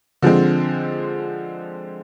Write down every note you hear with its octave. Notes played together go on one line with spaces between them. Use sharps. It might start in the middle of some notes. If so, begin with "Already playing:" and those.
D3 F3 G#3 C4